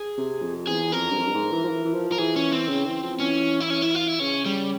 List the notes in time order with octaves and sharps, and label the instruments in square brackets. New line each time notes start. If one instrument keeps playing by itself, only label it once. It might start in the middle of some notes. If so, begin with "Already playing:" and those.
Already playing: [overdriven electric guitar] G#4
[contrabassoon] C3
F2
[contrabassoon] E2 [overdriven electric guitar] G#4
[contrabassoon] F2 [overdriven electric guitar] A#4
[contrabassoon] G2
F2
G2
G#2
E3
F3
E3
E3
F3
[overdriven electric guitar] A#4
[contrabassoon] E3 [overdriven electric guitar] G#4
[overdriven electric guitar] C#4
C4
[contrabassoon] C#3
E3
F3
[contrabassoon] E3 [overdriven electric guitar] C#4
[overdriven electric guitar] E4
C#4
E4
F4
E4
[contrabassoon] C#3 [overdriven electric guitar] C#4
[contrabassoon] C#3 [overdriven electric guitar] G3